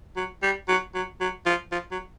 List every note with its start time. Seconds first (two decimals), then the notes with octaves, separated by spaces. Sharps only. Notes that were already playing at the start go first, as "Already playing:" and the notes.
0.16 F#3
0.43 G3
0.68 F#3
0.94 F#3
1.20 F#3
1.46 F3
1.72 F3
1.91 F#3